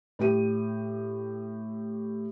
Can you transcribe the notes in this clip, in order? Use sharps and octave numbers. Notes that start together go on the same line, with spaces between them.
A2 G4 D#7